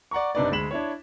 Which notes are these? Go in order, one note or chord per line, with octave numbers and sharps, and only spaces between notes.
D5 F#5 A#5 C#6
F#1 C3 D4 D#4 B4 D5
D2 G#3 B5 B6 E7 F#7
D4 E4 C#5